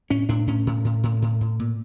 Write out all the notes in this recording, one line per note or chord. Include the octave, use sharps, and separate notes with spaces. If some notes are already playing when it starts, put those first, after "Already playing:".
A2 C#4
A2 D4
A2 C#4
A2
A2
A2
A2
A2
A#2